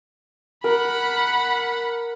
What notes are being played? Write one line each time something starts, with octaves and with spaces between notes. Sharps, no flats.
A#4 F#5 B5